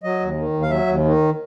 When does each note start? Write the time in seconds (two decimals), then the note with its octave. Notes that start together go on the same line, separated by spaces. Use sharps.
0.03 F#3 D#5
0.20 D#2
0.37 D#3
0.53 D#2
0.62 F5
0.70 F#3 E5
0.87 D#2
1.04 D#3